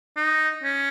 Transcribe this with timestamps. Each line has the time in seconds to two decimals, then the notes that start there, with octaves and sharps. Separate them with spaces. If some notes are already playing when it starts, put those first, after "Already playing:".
0.17 D#4
0.63 C#4